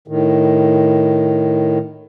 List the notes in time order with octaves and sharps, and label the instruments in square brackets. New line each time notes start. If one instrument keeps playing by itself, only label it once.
[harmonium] A2 D#3